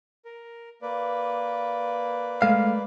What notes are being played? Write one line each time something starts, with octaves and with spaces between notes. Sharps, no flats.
A#4
A#3 B4 D5
G#3 A3 F5